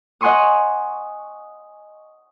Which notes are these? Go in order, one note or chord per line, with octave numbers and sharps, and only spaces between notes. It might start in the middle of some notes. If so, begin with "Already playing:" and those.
D#5 F#5 G#5 C6 C#6 D#6